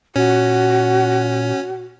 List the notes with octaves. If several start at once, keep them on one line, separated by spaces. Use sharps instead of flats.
A#2 C#4 F#4